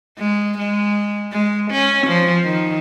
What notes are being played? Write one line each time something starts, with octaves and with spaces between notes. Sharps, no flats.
G#3
G#3
G#3
C#4
F3
D#3